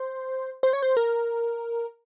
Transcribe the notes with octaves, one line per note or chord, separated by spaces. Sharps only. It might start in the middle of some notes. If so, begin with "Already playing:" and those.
Already playing: C5
C5
C#5
C5
A#4